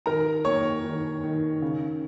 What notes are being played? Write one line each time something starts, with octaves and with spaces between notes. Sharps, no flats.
D#3 A#4 A#5
A#3 C#5 C#6
D#3
D#3
C#3